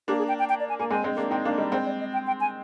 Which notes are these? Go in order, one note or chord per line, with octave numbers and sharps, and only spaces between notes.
A#3 D4 G4
G#4
G5
G5
G5
D5
G#5
A#3 G#5
G#3 C4 G#5
G#3 C4
A#3 D4
C4 D#4 G5
A#3 D4 F5
G3 A#3 D#5
G#3 C4 C5
D5
D#5
G5
G5
G#5